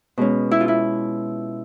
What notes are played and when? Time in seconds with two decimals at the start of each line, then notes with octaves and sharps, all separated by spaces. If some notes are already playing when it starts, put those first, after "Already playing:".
0.18 B2 G#3 C#4
0.51 E4
0.61 F4
0.68 E4